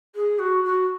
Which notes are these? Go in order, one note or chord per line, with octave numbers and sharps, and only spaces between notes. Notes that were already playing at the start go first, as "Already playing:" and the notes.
G#4
F#4
F#4